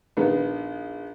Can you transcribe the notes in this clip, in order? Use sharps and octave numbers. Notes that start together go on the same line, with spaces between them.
A#1 D#3 B3